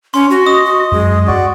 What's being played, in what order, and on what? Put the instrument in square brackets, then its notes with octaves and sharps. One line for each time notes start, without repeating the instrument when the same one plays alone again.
[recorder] C#4 [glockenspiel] C6
[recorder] F#4
[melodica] D#5 [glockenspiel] D#6
[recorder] F#4
[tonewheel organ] F#2 [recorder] G#3
[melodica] F#4 D5